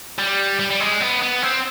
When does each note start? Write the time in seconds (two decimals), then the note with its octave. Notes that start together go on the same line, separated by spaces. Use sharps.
0.18 G3
0.60 G3
0.71 G3
0.80 G#3
1.01 B3
1.22 B3
1.43 C4